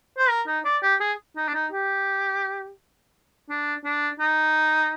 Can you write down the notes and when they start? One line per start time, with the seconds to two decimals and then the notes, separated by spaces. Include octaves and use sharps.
0.18 C5
0.29 A#4
0.47 D#4
0.65 D5
0.83 G4
1.00 G#4
1.37 D#4
1.48 D4
1.54 D#4
1.72 G4
3.50 D4
3.84 D4
4.20 D#4